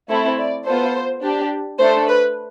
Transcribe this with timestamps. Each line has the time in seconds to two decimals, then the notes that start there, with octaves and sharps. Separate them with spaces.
0.09 A3 C4 E4 A4
0.38 D5
0.65 B3 F4 A4 C5
1.23 D4 G4
1.79 A3 D4 A4 C5
2.08 B4